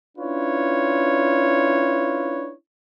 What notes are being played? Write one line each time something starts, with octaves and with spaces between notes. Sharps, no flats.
C#4 D4 E4 F4 B4 C#5